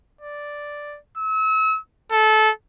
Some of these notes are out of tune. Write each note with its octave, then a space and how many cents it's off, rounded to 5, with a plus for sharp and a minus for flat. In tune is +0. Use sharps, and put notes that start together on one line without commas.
D5 +0
E6 -35
A4 -20